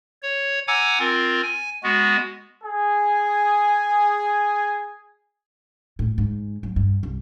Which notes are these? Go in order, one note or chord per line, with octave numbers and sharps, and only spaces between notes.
C#5
F#5 G#5 A#5 D6 E6 G#6
C4 F4 A#4
G#5
G#3 B3 F#4
G#4 G#5
A2
G#2
F#3
G2
C2